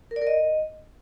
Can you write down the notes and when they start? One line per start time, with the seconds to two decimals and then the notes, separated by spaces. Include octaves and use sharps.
0.11 A#4
0.16 D5
0.21 A#4
0.27 D#5